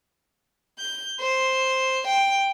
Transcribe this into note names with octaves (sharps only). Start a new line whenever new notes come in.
G6
C5
G5